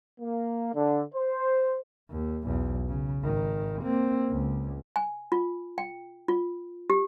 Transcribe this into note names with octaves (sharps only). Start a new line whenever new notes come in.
A#3
D3
C5
D#2
B1 E2
C#3
G#1 D#3
A#3 C4
C#2
G#5
F4
G5
F4
G4